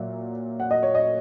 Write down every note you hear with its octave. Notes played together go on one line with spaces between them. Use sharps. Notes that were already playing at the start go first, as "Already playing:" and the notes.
Already playing: A#2 F#3 E5
F#5
D#5
C#5
D#5